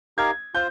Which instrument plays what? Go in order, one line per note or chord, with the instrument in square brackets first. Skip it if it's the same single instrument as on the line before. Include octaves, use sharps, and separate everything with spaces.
[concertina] D#4 G4 A#4 F5 [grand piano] G#6
[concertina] F4 C5 [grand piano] G6